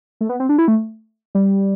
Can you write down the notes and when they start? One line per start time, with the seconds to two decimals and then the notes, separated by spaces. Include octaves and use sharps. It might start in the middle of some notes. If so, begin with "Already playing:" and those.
0.21 A3
0.29 B3
0.40 C4
0.49 D4
0.58 E4
0.68 A3
1.35 G3